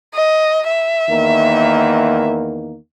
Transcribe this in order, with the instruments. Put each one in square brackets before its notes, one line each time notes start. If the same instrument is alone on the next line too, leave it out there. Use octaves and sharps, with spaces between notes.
[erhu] D#5
E5
[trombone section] E2 D#3 A#3